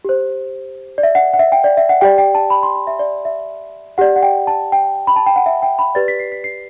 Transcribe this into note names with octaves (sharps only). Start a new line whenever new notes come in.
G4 C5
D5
E5
F#5
F#5
E5
G5
D5
E5
F#5
G4 D5 G5
G5
A5
B5
C6
B5
E5
D5
E5
G4 D5 F#5
F#5
G5
A5
G5
B5
A5
G5
F#5
E5
G5
B5
G4 B4 D5 A6
B6
C7
B6
C7